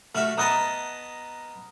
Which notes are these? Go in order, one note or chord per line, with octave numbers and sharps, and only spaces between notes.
A3 F#4 E5 F6
B3 D#5 A5 A#5 D#6 F#6